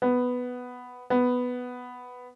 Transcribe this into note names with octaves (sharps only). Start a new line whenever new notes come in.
B3
B3